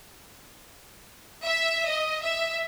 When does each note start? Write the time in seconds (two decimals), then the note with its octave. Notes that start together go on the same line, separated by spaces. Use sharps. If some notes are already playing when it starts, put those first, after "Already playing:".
1.45 E5
1.89 D#5
2.22 E5